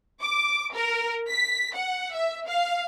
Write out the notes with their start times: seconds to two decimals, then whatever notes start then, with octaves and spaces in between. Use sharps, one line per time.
0.21 D6
0.73 A#4
1.29 B6
1.75 F#5
2.13 E5
2.47 F5